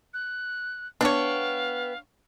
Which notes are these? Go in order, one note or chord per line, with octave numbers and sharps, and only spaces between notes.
F#6
B3 D4 C#5 F5 G5